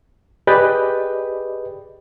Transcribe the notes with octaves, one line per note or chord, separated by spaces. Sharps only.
G4 G#4 B4 D5 D#5 G5